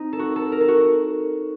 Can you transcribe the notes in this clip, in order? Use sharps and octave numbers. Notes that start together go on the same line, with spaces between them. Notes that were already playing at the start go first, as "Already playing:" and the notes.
Already playing: C4 D#4
A4
F#4
A4
A#4
A4
F#4